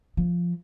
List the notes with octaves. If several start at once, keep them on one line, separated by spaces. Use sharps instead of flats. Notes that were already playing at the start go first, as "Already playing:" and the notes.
F3